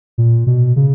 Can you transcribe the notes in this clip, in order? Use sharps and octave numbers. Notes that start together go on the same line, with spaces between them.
A#2
B2
C#3